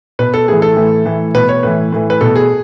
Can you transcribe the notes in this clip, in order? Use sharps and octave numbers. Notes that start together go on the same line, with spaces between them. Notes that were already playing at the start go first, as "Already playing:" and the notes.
B2 B4
A4
A2 E3 G#4
A4
A2 E3
A2 E3
B2 B4
C#5
A2 E3 B4
A2 E3
B4
B2 A4
G#4